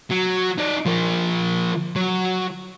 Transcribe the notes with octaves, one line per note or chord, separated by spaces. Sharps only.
F#3
D#4 D5
F3 A#4
F#3